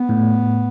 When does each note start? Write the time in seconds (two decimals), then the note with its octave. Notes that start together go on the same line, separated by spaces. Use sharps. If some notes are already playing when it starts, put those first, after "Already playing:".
Already playing: B3
0.09 A2